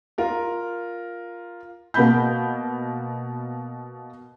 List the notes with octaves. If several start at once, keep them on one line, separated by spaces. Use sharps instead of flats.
F4 A#4 F6
B2 A#3 A#4 B5 G6